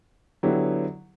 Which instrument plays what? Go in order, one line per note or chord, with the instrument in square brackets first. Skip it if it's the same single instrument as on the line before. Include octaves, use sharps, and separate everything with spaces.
[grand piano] D3 F#3 B3 E4 G4